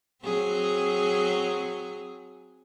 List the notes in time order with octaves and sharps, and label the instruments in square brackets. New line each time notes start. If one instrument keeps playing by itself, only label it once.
[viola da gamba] F#3 C4 G#4